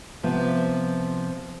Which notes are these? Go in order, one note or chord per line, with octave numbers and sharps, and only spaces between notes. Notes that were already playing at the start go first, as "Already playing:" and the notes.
C3 F3 B3